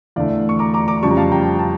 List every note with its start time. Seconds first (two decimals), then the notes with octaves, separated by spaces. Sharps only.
0.16 E2 D3 A3 D5 F5
0.49 C#6
0.59 A#5 D6
0.74 A#5 D6
0.88 A#5 D6
1.03 F2 C#3 G3 A5 C#6
1.11 A#5
1.17 F5 A5
1.32 G5 A#5
1.59 A5